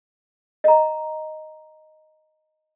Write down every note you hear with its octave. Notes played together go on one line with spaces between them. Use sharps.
D#5 A#5